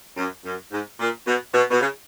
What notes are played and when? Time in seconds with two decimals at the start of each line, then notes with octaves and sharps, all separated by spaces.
0.17 F#2
0.45 F#2
0.71 G#2
0.99 A#2
1.26 B2
1.54 B2
1.71 B2
1.81 C#3